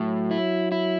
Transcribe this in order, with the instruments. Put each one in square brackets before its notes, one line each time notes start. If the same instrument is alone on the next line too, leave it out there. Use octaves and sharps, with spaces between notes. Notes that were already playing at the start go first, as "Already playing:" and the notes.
Already playing: [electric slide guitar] A2 [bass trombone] F#3
[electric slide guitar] E4
E4